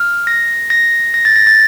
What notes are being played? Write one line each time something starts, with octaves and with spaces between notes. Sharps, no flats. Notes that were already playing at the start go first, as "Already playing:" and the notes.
Already playing: F6
A#6
A#6
A#6
A6
A#6
A6